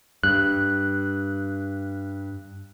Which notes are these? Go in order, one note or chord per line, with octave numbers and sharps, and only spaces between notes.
G2 F#6